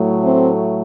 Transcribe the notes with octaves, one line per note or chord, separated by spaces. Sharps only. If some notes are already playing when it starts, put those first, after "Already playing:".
Already playing: A2 F#3 A3
C4